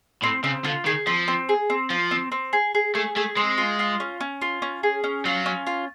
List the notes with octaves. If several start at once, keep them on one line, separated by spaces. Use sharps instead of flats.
A2 C4
C#3 C4
D3 F4
D#3 G#4
F3 C4
C4
G#4
C4
F3 F4
C4
C4
G#4
G#4
A3 G#4
A3 G#4
G#3 C4
F4
F4
C#4
C#4
F4
C#4
G#4
C#4
F#3 F4
C#4
F4